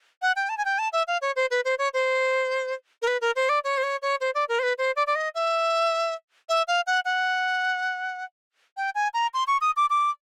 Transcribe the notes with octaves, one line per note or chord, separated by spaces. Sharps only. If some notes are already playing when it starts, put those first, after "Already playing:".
F#5
G5
A5
G#5
G5
A5
E5
F5
C#5
C5
B4
C5
C#5
C5
A#4
B4
A#4
C5
D5
C#5
C5
C#5
C#5
C5
D5
A#4
C5
B4
C5
D5
D5
D#5
E5
E5
F5
F#5
F#5
G5
G#5
A#5
C6
C#6
D#6
D6
D6